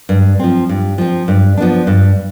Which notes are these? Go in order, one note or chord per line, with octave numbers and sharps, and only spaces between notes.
G2
F3 C4
G2
F3 C4
G2
F3 B3 D4
G2